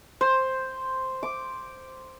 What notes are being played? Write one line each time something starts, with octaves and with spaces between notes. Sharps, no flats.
C5
D6